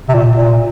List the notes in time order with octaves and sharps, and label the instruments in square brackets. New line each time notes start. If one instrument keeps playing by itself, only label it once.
[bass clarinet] C3
A#2
A#2